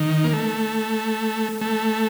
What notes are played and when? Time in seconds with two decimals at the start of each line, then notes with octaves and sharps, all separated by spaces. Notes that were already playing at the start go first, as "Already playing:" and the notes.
Already playing: D#3
0.24 A#3
0.34 A3
1.61 A3